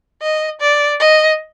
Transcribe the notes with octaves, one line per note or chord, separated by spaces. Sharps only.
D#5
D5
D#5